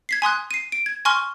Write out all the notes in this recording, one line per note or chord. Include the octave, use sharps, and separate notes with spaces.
G#6 B6 C7
G#5 C6 D#6 F#6
C7 D#7
D7
G#6
G#5 C6 C#6 F6 G7